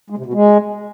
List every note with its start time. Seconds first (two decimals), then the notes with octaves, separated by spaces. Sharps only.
0.10 G#3
0.18 C3
0.26 B2
0.33 G#3